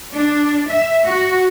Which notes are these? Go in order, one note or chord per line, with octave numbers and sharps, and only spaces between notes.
D4
E5
F#4